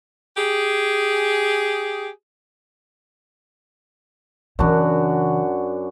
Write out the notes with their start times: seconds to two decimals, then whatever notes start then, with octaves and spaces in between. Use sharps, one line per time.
0.37 G4 G#4
4.59 F#2 C#3 E3 D4 F#4